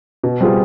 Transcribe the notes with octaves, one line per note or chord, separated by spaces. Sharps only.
B2
G3 C4 F4 G#4